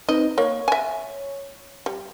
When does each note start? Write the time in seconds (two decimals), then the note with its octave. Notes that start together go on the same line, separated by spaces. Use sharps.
0.09 C4 D#4 B4 D#5
0.38 A#3 C#5
0.68 E5 G#5
1.86 G3